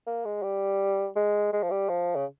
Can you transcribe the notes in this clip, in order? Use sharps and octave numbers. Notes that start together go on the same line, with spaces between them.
A#3
G#3
G3
G#3
G#3
F3
G3
F3
C#3